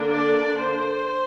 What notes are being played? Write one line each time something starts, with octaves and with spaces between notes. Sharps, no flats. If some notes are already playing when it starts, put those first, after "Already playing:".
Already playing: D3 A#3 D4
D5
C5